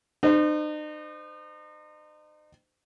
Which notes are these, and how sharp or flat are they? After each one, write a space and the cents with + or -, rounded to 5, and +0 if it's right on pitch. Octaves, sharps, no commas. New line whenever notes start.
D#4 -40 C5 -30